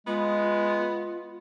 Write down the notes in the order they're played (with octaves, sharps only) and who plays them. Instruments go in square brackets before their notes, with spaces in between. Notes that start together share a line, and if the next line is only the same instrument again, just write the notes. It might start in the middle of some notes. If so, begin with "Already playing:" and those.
[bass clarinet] G#3 [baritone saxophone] B3 [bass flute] F4